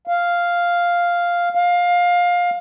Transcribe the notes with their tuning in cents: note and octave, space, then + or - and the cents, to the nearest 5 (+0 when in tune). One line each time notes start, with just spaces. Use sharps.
F5 +0
F5 +20